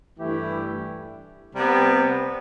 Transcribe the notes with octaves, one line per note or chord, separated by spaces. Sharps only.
G2 E3 A3 E4 G4
C3 G3 B3